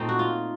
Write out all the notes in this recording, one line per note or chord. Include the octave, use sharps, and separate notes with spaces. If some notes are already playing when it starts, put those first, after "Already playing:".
Already playing: A#2 A3 C4 D#4
F#4
F4